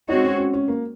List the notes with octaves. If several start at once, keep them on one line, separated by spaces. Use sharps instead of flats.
G#3 C4 D#4 F#4 C#5
C#4
C#4
C#4
A#3